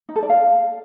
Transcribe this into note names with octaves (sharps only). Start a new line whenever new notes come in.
D#4
A4
D5
F5